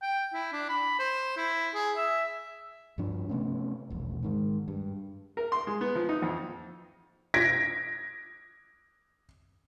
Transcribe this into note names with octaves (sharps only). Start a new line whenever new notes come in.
G5
E4
D4
B5
C5
E4
G#4
E5
G2 F3 D4
C3 A3 B3 C#4
E1 A#1
G#2 D#3 G#3
G2
A#4
C6
G#3
B3
F3
D#4
F2
G#6 A#6 B6 D7